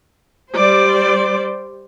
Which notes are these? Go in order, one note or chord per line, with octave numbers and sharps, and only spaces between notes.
G3 C5 D5